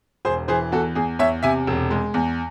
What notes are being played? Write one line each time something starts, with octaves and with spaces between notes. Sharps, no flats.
E1 G#4 C5
E3 G#4 C5
E2 F#4 A4
E2 G#4
E2 C#5 E5
C3 E5 G#5
E1
G#3
E2